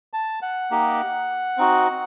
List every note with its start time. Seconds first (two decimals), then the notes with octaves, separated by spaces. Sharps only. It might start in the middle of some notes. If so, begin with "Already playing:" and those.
0.13 A5
0.42 F#5
0.71 A#3 D#4 G4
1.57 C4 D#4 F#4